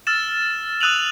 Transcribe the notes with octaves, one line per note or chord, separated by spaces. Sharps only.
E6 F6 A6 E7
D#6 E6 F#6 D#7 F7 F#7